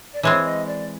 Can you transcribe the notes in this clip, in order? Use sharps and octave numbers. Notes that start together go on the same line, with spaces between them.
D5
E3 G#3 C4 C#5
D#5
D5